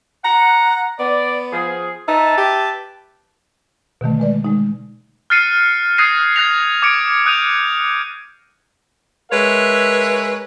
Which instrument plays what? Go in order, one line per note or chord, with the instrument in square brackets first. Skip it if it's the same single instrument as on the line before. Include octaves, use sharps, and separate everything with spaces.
[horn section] F#5 [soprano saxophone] A#5
[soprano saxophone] B3 [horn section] D5
[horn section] F3 G#4
[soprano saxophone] D#4 [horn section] B4 E5 A5
[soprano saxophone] G4
[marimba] B2 D3 D#3 A3
G#3 B4 D5
G#3 D#4
[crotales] F6 F#6 A6 C7 C#7 D#7
D#6 F#6 G#6 A#6 C7 D#7
F#6 G#6 A#6 C7 F7
D6 G#6 C#7 D7
D#6 F#6 G6 D#7 F7
[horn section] G#3 A#4 B4 C#5 E5